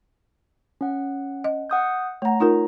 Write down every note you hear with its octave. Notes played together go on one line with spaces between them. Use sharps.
C#4 F#5
D#5
F#5 D#6 G6
A3 C#5 F#5 A#5
D#4 F4 A#4